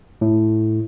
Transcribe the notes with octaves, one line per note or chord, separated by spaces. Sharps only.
A2